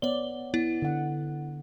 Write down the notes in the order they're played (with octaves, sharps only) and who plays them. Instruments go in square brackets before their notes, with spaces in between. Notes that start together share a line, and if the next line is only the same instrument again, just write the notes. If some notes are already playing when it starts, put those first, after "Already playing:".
[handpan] B3 D5 [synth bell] C#5 G7
[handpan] B3 [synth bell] E4
[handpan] D3 F#5